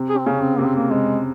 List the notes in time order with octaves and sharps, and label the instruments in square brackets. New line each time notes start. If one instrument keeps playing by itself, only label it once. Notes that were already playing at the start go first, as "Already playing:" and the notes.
Already playing: [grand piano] C3
[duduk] G#4
C4
[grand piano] C#3 [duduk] C#4
[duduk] C4
[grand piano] C3 [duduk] A#3
[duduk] C4
A#3
[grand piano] C3 [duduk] G#3